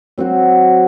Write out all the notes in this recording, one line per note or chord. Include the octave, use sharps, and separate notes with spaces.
F#3 C4 F#4 C5